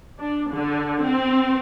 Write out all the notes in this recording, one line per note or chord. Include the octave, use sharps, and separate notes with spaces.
D4
D3
C4